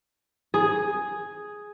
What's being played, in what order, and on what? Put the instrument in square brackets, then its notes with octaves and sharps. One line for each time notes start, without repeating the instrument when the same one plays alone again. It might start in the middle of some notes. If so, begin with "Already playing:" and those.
[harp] G#4